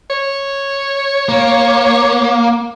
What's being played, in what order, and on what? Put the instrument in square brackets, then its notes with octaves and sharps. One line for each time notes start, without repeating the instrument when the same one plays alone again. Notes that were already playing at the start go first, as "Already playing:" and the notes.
[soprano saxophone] C#5
[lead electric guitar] A#3